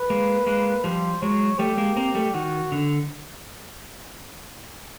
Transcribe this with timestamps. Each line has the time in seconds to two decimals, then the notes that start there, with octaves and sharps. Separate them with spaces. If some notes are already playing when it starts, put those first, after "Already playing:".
Already playing: B4
0.10 G#3 A#3
0.46 G#3 A#3
0.84 F3 G3 C5
1.22 F#3 G#3 C#5
1.59 G3 A3 G4
1.77 G#3 A#3
1.97 A#3 C4
2.15 G3 A3
2.34 D#3 F#4
2.72 D3